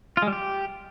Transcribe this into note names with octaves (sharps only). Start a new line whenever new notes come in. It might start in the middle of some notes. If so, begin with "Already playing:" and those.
F4
G#3
G3
G4